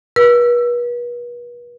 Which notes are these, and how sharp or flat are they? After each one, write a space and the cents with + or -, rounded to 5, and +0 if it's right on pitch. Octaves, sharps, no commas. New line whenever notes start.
B4 -40 E6 +20